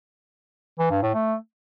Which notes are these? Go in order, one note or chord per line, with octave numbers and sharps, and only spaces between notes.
E3
G2
A2
A3